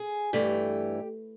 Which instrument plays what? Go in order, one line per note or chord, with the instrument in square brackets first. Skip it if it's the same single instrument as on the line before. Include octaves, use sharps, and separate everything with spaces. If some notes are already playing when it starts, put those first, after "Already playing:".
Already playing: [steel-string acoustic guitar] G#4
G2 E3 A3 G4